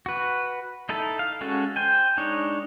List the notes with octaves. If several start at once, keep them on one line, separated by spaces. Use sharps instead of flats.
F#4 B4
D#4 E4 A4 A5
F5
G#3 C#4 F#4 A4
C5 G5 G#5
G#3 D4 D#4 C#5